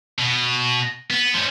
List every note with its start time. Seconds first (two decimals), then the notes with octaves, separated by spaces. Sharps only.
0.19 B2
1.11 B3
1.34 F3 C#4